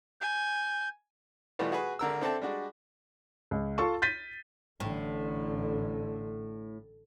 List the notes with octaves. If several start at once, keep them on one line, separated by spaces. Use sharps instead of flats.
G#5 G6
B2 E3 G3 A3 B3 F4
F#4 G#4 B4
G#1 D3 A#4 E6
C4 D4 A4 E5 G5 A5
G3 G#3 D4 F#4
C#2
F4 A4 A5 C#6
G6 A6 B6 D#7
A1 A2 D3